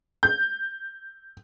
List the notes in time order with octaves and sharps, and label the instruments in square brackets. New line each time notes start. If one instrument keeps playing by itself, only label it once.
[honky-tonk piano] G6